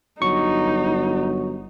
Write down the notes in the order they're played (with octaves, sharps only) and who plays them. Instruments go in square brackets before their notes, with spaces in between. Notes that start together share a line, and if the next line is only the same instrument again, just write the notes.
[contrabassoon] G1 [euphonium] F#3 [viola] D#4 [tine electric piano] C#6